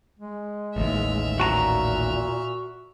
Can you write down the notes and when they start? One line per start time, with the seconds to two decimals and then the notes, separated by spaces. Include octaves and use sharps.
0.19 G#3
0.76 A1 D#2 E5 F6
1.40 A#2 F#4 A5 A#5